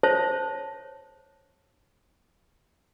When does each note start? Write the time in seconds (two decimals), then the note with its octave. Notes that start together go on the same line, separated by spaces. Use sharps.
0.03 C5 C#5 E5 A5